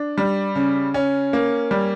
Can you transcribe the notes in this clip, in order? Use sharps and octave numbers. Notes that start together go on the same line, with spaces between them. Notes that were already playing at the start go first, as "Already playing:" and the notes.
Already playing: D4
G3
C#3
C#4
A#3
G3